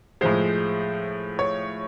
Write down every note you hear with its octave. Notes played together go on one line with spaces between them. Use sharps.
A2 F3 G#3 C5
C#5